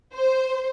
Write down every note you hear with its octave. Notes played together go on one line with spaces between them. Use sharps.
C5